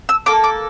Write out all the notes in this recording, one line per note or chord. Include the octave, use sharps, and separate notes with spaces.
E6
A#3 F4 A4 D6
D6